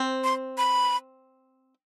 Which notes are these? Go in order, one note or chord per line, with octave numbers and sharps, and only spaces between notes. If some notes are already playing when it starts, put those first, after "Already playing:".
Already playing: C4
C6
B5